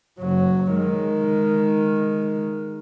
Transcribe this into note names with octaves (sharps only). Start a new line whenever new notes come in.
F#1 F#3
D#3 G#3